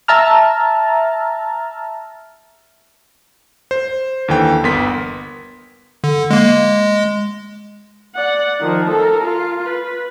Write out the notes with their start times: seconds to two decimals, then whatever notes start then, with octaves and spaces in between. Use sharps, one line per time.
0.08 E5 A5 A#5 F6
3.71 C5
4.28 D#2 D3 E3 G5
4.64 G1 B3 A#4 C6 B6
6.04 D3
6.31 G#3 A#3
6.50 G#3
8.15 D5 F#5
8.61 D#3 F3
8.90 A4 A#4
9.24 F4
9.66 B4